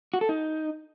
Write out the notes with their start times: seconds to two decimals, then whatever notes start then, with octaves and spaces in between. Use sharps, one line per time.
0.14 F#4
0.21 A4
0.29 D#4